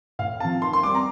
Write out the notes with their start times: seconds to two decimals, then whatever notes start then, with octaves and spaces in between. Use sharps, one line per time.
0.19 A2 F5
0.40 F3 C4 A5
0.62 D#3 C6
0.73 C6
0.83 G3 C4 D6
0.95 A#5